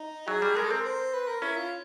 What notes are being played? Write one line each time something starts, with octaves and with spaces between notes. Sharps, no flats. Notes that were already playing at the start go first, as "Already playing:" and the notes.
Already playing: D#4
F#3 G#4
G3
G#3 A#4
A4
C4 A#4
C5
B4
A#4
C#4 E4
F4